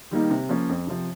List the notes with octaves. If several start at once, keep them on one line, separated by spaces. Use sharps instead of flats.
D#3 G3 A#3 D#4
C3
F3 A#3 C#4
F2
C3 F3